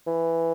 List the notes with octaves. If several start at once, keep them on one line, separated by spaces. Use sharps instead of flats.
E3